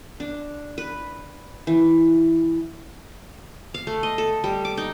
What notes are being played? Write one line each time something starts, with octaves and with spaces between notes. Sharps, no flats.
D4
B4
E3
F5
A3
D#5
A4
G3
D6
D#4